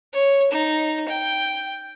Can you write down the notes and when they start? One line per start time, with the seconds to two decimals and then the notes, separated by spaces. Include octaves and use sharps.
0.13 C#5
0.51 D#4
1.08 G5